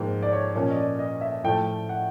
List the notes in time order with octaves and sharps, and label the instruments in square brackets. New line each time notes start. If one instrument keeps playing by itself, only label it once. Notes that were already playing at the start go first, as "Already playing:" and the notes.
Already playing: [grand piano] G#2 F3 A#3 G5
D5
C#5
A#2 F3 A#3 C#4 C#5
D#5
D5
D#5
E5
A2 F3 A3 G5
F#5